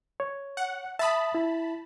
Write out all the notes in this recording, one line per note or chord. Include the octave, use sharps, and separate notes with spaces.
C#5
F#5
E5 A5 B5 D#6
E4